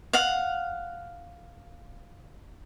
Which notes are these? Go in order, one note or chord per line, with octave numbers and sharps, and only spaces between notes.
F5 F#5